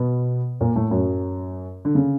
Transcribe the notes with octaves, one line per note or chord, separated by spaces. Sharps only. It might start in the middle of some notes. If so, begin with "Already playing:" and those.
Already playing: B2 B3
A#2 A#3
A2 A3
F#2 F#3
D3
C#3